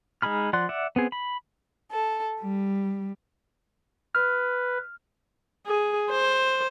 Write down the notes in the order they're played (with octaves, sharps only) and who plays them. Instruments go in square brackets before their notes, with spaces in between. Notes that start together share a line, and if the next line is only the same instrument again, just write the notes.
[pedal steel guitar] G#3 D#4 G#4 B5 F6
F3 D5 F#5 C6 F#6
D5 E5 F#5
B3 C4 G#4
B5
[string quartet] A4
G3
[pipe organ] B4 [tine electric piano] F6
[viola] G#4
C5